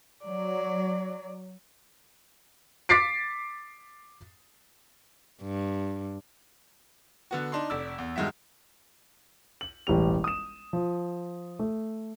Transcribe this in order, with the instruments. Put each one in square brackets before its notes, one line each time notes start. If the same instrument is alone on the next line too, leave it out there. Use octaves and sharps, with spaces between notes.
[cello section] F#3 [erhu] D5
[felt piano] D6 A6 B6 C7 D7
[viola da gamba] G2
[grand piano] D3 B3 F#4
D4 D#4 C6
F1 D5 E6
E2
G2 D#3 G#3 F#4 E5
F#7
E1 A1 G3 F7
D#6 E7
F3
A3